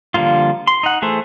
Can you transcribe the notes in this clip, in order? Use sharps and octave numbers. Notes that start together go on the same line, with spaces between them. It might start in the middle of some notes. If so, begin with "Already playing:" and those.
D3 F3 G3 A#3 F4
C6
D#4 F#5
E3 A3 G#4 A4 C5